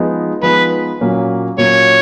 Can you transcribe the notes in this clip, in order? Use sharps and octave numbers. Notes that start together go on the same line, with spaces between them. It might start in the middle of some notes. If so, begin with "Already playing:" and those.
Already playing: F3 G#3 B3 D#4
F3 G#3 B3 D#4 B4
A#2 F#3 A#3 C#4
A#2 F#3 A#3 C#4 C#5